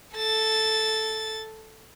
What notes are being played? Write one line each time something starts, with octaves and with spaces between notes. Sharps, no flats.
A4 A6